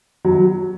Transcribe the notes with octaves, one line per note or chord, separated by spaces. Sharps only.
F#3